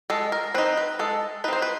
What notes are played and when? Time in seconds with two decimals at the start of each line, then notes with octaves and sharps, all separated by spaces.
0.10 G#3 A4
0.32 A#4
0.54 C4 B4
0.58 D#4
0.77 B4
0.99 G#3 A4
1.44 D#4 B4
1.48 C4 C5
1.62 B4